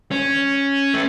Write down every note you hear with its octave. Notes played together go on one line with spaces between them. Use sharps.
C#4
A3